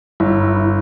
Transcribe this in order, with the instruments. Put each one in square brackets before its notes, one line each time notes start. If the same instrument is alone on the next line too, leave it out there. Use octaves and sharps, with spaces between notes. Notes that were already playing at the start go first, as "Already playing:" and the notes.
[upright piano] G1 [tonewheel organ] E4